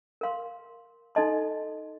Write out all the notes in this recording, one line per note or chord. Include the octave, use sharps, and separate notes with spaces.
A#4 F5 C6
D#4 A4 D#5 A5 C6